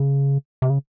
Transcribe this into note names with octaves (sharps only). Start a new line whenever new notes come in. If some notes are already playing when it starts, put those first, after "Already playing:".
Already playing: C#3
C3
C#3